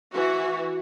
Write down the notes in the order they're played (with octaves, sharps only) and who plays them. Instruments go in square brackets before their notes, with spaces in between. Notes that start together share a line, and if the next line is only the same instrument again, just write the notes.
[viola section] E3 F#4